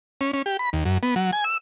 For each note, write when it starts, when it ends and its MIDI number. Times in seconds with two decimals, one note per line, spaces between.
0.21 0.31 61
0.33 0.42 61
0.46 0.57 67
0.59 0.70 83
0.73 0.84 39
0.85 0.98 42
1.03 1.15 59
1.16 1.31 54
1.33 1.44 80
1.44 1.57 88